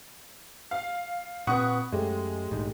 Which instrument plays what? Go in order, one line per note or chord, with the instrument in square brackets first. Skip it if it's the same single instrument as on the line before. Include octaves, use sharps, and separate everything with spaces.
[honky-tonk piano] F5
[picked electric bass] A#2 C4 [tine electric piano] B4 B5 [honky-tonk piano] F#5 C#6 D#6
[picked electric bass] F#2 [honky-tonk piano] G#3 [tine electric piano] A3 G4
[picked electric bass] A#1 G#2 D#3